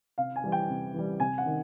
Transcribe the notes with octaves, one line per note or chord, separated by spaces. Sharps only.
C3 F5
G#5
E3 G3
G5
C3
E3 G3
C3 G#5
F#5
D#3